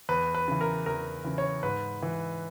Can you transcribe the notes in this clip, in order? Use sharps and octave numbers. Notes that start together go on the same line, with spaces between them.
E2 B4
B4
C#3 E3
A#4
E2 A#4
C#3 E3
C#5
G#2 B4
E3